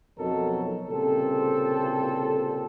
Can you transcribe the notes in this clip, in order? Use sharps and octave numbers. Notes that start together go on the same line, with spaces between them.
F2 B2 F#3 D#4 A4 A#4
C2 A#2 C#3 C4 A4